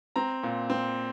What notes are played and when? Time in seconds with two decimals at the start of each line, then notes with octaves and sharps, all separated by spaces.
0.16 C4 A#5
0.43 A#2
0.70 C4